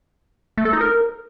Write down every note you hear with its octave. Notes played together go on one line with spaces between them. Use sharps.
A3
A4
D#4
A#4